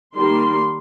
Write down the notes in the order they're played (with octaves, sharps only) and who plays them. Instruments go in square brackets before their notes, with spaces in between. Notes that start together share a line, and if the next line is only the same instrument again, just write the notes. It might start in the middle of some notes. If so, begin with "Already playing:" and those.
[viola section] D#3 G3 A#3 C6